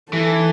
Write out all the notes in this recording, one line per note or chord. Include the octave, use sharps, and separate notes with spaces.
E3 A4